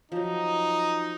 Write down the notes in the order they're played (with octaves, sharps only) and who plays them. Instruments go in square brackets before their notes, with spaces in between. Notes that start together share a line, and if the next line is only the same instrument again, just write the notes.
[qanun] F3 F#3 [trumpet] D#4